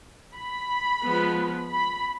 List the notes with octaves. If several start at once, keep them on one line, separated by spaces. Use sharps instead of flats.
B5
F3 G#3 B3
B5